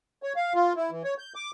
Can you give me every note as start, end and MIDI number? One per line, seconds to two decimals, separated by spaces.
0.23 0.33 73
0.36 0.53 77
0.55 0.73 65
0.76 0.91 64
0.91 1.03 52
1.04 1.14 73
1.18 1.33 91
1.35 1.51 86